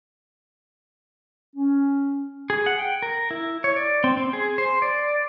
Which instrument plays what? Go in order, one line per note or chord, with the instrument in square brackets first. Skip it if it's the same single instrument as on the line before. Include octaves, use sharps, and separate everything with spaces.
[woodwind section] C#4
[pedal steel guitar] G#4
F#5
G5
A#4
E4
C#5
D5
C4
C4
G#4
C5
D5